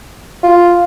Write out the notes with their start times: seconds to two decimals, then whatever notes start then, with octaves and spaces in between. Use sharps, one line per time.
0.43 F4